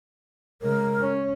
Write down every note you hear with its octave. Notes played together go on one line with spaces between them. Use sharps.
C#3 G#3 A#4
C#4